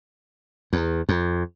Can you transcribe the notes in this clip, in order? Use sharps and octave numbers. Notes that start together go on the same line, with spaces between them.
E2
F2